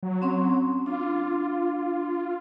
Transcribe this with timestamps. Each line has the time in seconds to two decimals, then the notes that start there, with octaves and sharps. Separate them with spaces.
0.03 F#3
0.22 C4 C#4 C6
0.86 D4 F4